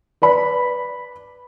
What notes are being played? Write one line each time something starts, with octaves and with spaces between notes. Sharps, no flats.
B4 D5 B5